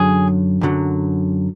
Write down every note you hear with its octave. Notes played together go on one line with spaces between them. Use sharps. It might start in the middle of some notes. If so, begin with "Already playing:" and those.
Already playing: F#2 D3 F#3 G#4
F#2 D3 F#3